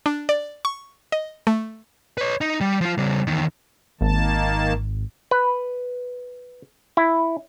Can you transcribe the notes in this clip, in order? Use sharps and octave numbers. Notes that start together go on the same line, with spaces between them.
D4
D5
C#6
D#5
A3
B4 C#5
D#4
G3
F3 F4
C#3 G3
E2 D#3
G#1 D#3 A#3 A5
B4
E4